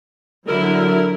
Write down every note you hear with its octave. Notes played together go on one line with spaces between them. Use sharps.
D3 F#3 E4 A#4